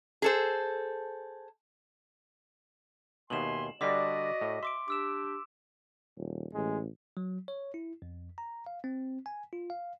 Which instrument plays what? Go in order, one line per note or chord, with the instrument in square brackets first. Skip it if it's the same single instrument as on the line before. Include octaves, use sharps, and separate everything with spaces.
[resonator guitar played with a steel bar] G#4 A4 C5
[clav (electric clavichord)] D#2 B2 [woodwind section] E5 G#5 C6 [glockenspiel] E7 F#7
[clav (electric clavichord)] D3 G3 D4 [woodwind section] F#4 D5 D#5 [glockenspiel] D6 B6
[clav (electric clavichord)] A2
[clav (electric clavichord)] E5 [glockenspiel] C6 D6 D7
[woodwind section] D4 G4 [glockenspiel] D6 E6 E7
[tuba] D#1
[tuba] A1 [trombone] G#3
[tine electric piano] F#3
C#5
E4
F2
A#5
F5
C4
G#5
F4
F5